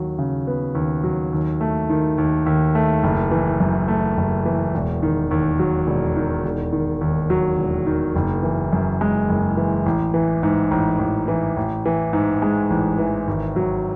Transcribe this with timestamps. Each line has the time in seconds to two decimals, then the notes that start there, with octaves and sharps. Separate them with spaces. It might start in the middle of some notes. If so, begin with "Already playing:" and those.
Already playing: D#2 F#3
0.19 C#3
0.47 B3
0.75 D#2
1.04 F#3
1.33 D#2
1.61 A3
1.90 D#3
2.18 D#2
2.46 D#2
2.75 A3
3.03 F#1
3.31 E3
3.60 F#2
3.88 A3
4.17 F#1
4.45 E3
4.74 E1
5.03 D#3
5.31 D#2
5.59 F#3
5.87 E1
6.16 D#3
6.45 E1
6.73 D#3
7.01 D#2
7.30 F#3
7.58 E1
7.87 D#3
8.15 F#1
8.43 E3
8.73 F#2
9.01 G#3
9.29 F#1
9.57 E3
9.86 A1
10.14 E3
10.43 G#2
10.71 A1
10.99 A1
11.28 E3
11.57 A1
11.86 E3
12.13 G#2
12.42 G#3
12.70 A1
12.98 E3
13.27 G#1
13.56 F#3